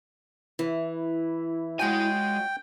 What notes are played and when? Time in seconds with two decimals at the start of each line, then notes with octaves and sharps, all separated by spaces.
0.59 E3 E4
1.79 G#3 C#4 F4 F#4 G5 G#5